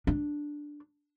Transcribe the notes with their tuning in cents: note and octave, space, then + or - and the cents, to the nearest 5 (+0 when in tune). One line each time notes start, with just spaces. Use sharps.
D4 +0